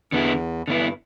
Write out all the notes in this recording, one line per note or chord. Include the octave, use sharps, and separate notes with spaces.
E2 D3 B3 E4
G2 D3 B3 E4